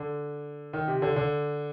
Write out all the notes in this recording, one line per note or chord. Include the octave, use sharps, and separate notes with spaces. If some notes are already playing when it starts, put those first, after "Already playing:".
Already playing: D3
D#3
C3
D3
D3